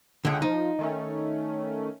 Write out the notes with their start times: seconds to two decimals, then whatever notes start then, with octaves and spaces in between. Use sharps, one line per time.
0.25 C#2 D3 G#4 F#5 G5
0.42 F3 D#4
0.79 D#3 A3 C#4